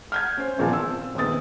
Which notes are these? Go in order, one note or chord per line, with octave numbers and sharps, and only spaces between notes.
F6 G6 G#6
C#4 C5
G#1 E2 A#2 F3 G#5 A5
E6
C4
D#1 G#2 C3 B3 D#6 A6